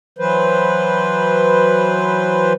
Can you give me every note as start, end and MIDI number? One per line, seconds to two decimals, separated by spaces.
0.19 2.53 52
0.19 2.53 54
0.19 2.53 71
0.19 2.53 72